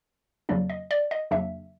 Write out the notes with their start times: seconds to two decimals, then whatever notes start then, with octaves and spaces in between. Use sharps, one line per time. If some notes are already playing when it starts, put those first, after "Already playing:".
0.49 F2 C#3 F#3 A#3 D4 D5
0.70 D#5
0.91 D5
1.11 D#5
1.31 F2 C#3 F#3 A#3 D4 E5